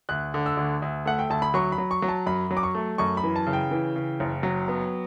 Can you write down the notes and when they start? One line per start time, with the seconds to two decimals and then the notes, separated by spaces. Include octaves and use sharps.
0.09 D2 F#6
0.34 D3
0.46 E6
0.57 D2
0.82 D2
1.05 A3 F#5
1.19 G5
1.30 D2 A5
1.42 B5
1.54 F#3 C#6
1.72 B5
1.78 F#3
1.91 C#6
2.02 F#3
2.08 A5
2.26 F#2 B5
2.51 F#3
2.57 D6
2.63 C#6
2.75 A3
2.98 F#2 C#6
3.17 B5
3.24 E3
3.36 A5
3.47 C#3
3.53 G5
3.71 E3
3.96 C#3
4.20 F#1
4.43 F#3
4.68 B3